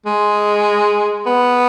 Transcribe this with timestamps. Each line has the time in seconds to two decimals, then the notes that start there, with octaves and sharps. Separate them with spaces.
0.06 G#3
1.26 B3